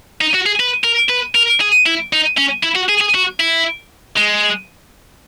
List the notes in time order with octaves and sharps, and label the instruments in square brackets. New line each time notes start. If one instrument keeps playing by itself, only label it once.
[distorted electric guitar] D#4
F#4
G#4
B4
A#4
B4
A#4
G#4
E4
D#4
C#4
E4
F#4
G#4
G#4
F#4
E4
G#3